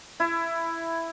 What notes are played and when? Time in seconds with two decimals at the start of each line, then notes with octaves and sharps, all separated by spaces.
0.20 E4